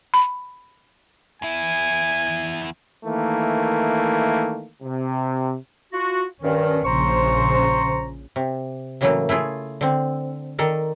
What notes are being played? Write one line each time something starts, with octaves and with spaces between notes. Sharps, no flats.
B5
E2 E4 G#5
D#3 E3 A3 A#3
C3
F4 F#4
G2 D#3 C#4
A#1 C#3 C5 A#5 C#6
C3
A2 C#3 E3 F#3 A3 A#3
A3 E4 F4 G#4
D3 C4
D#3 A4 A#4 D5